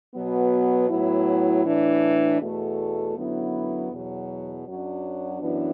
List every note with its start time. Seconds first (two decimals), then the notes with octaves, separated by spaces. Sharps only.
0.15 B2 F#3 B3
0.89 A2 F#3 B3 E4
1.65 A2 E3 D4
2.40 E2 B2 A3
3.16 F#2 D3 F#3 B3 E4
3.90 E2 B2 F#3
4.66 F#2 F#3 D4
5.41 F#2 E3 B3 D4